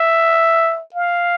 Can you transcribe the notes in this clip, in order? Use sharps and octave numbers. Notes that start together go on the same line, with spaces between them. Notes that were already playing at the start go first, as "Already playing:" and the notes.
Already playing: E5
F5